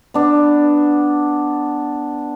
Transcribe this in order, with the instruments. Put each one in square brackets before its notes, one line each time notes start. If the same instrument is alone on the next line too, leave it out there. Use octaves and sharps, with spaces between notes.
[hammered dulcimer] B3 D4